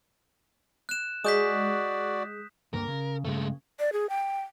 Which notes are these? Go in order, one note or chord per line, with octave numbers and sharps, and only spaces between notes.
F#6 E7
G#3 F#4 D5 D#6 G6 B6
D2 G2 A#3 A#4
C#3
G2 C#3 G#3 A3
D5
G#4
G5